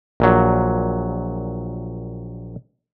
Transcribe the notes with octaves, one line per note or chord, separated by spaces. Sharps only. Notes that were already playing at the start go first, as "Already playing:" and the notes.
A#1 A#2 F#3